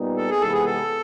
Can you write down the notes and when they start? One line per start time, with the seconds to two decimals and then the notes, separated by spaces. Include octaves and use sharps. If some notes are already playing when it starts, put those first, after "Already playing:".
Already playing: A#2 G3 B3 D#4
0.17 A4
0.30 G#4
0.41 C3 E3 G#3 B3 A4
0.53 G#4
0.65 A4